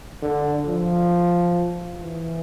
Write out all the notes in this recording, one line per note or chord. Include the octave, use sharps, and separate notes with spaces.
D3
F3
E3